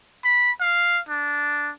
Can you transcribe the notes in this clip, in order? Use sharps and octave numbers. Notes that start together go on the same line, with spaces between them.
B5
F5
D4